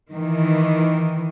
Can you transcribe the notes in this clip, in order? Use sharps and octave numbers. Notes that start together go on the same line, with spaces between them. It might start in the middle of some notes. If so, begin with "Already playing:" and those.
D#3 E3